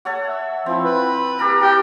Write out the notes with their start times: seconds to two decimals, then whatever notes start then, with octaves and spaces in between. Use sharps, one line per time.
0.05 A4 C#5 F#5
0.26 E5
0.66 F3 C4 E4
0.84 B4
1.39 G4 A4 A#4
1.61 G4 G5